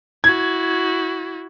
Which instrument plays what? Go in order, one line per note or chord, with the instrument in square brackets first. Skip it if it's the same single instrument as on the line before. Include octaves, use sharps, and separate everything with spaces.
[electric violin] E4 F#4 [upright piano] G#6